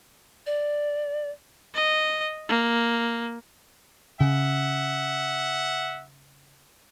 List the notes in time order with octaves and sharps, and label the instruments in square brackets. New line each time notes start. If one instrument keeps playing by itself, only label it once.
[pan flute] D5
[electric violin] D#5
A#3
[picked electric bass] C#3 [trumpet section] E5 F#5